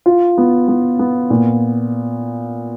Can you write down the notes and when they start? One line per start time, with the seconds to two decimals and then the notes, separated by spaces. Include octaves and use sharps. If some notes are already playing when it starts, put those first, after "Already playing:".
0.06 F4
0.38 B3
0.68 B3
0.99 B3
1.30 A#2